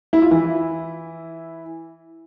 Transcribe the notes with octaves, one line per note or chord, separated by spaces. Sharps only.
E4
F4
E3 E4